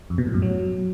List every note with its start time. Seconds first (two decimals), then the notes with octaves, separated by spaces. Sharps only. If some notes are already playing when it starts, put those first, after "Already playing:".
0.10 F2
0.18 B2
0.26 A2
0.34 F#2
0.42 F#3